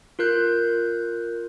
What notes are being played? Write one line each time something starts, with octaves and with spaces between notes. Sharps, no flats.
F4 A#4 F#6 G6